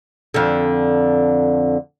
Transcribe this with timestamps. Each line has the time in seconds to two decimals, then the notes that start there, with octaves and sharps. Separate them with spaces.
0.34 F2 D3